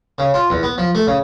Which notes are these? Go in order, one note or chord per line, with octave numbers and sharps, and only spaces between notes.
C#3
F4
E2
B3
F3
A3
C#3